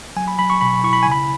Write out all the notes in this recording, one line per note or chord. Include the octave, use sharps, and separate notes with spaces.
F#3 G#5
B5
F#3 B5
C#6
B2 B5
E4 C#6
B5
C#3 G#5
B5